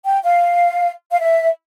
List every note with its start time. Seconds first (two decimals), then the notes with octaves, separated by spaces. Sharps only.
0.04 G5
0.23 F5
1.11 F5
1.20 E5